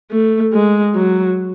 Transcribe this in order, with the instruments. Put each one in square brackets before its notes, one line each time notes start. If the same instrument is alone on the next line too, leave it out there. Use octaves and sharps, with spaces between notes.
[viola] A3
G#3
F#3